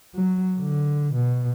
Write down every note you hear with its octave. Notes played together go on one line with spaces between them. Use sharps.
F#3
D3
B2